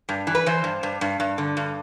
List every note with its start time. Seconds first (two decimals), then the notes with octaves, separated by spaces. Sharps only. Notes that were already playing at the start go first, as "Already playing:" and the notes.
0.09 G2
0.27 E3
0.35 B4
0.46 E3 C5
0.64 G2
0.83 G2
1.01 G2
1.20 G2
1.38 D3
1.57 G2